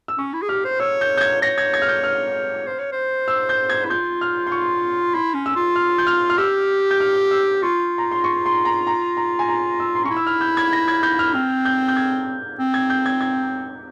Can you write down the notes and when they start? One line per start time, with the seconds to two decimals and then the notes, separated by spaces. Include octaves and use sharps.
0.08 E6
0.18 C#4 C#6
0.34 E4
0.42 G#4
0.49 G4 F6
0.65 C5
0.80 C#5 E6
1.01 G6
1.17 G6
1.21 G#6
1.42 C#5 A#6
1.58 G#6
1.74 G#6
1.82 F6
1.88 G6
2.04 F6
2.67 C5
2.79 C#5
2.92 C5
3.28 E6
3.49 G6
3.70 G#6
3.85 E4
3.90 F4 G6
4.21 F6
4.47 C6
4.52 C#6
5.14 E4 C6
5.34 C#4
5.46 E6
5.56 F4
5.76 F6
5.98 G6
6.07 F6
6.30 F6
6.38 G4 E6
6.91 G6
7.00 F6
7.31 E6
7.63 F4 C#6
7.98 A#5
8.12 C6
8.24 C#6
8.46 C6
8.65 A#5
8.87 A#5
9.17 A#5
9.39 G#5
9.49 A#5
9.80 E6
9.95 C6
10.04 C#4 C#6
10.11 E4
10.17 E6
10.27 F6
10.41 G6
10.57 G#6
10.73 A#6
10.88 G#6
11.03 G6
11.19 F6
11.34 C4 F6
11.65 G6
11.88 G6
11.97 G#6
12.59 C4
12.74 G#6
12.90 G6
13.06 G#6
13.21 G#6